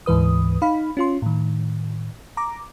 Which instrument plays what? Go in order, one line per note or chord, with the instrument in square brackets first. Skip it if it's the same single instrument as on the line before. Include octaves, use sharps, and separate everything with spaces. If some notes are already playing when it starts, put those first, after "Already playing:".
[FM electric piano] D2 G#2 E3 B4 D#6
D#4 F5 B5
C#4 F4 C6
A2 D#3
A#5 D6